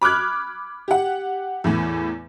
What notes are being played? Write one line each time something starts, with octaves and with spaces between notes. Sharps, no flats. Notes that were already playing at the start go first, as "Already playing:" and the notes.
B5 D6 F6 F#6 G#6
G4 F#5
E2 A2 E3